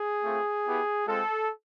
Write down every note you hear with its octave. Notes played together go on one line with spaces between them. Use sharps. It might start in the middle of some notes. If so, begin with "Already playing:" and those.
Already playing: G#4
A3 C4 F4
B3 E4 G4
G#3 C4 F4 A4